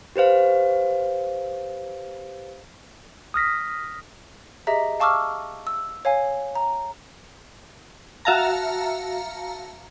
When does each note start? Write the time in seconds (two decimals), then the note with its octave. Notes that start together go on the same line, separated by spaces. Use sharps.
0.16 G4 B4 C5 F5
3.34 D#6 F6 A#6 B6
4.67 G4 G#4 D#5 E5 A#5
5.00 F5 A5 C#6 D6 E6 F6
5.67 E6
6.05 C#5 F5 G#5
6.55 A#5
8.25 F#4 E5 F5 A5 A#5